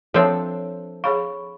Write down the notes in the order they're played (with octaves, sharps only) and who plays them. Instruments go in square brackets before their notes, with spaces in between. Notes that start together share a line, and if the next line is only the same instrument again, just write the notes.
[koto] F3 C4 D4 [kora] A4 [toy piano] C5 C#5 E5
[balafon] G#4 C#5 F5 [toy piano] B5 C#6